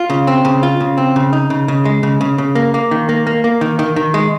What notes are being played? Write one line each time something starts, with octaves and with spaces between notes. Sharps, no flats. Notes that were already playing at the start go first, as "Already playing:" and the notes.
Already playing: F4
C#3
C4
C#3
F4
C#3
C4
C#3
D#4
C#3
C#3
G#3
C#3
C#3
C#3
A#3
A#3
D#3
A#3
A#3
A#3
D#3
D#3
D#3
G#3